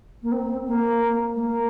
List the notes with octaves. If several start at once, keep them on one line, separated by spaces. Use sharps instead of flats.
A#3
C4
A#3
A3
A#3